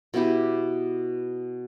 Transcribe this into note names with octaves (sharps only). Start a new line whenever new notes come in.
B2 B3 E4 G4